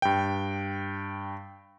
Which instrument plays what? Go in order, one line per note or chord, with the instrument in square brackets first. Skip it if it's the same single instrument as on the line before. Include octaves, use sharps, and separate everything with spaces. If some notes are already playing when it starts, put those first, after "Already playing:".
[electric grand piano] G2 G5